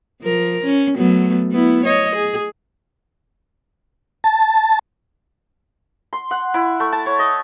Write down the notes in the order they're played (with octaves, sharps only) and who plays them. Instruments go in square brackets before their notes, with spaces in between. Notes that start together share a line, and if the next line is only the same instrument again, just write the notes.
[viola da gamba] F3 A#4
C#4
F#3 A3 B3
B3 E4
C#5 D#5
G#4
[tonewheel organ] A5
[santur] C6
F#5
E4
A3
A5
C#5
D#5